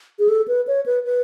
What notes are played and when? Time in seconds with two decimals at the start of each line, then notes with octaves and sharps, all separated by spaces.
0.19 G#4
0.28 A4
0.48 B4
0.67 C#5
0.86 B4
1.05 B4